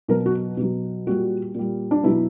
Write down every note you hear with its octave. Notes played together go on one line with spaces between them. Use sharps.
B2 F#3 A#4
F#4
B2
F#3
A#2 G3 F#4
A#2 G3
D4
B2 F#3 E4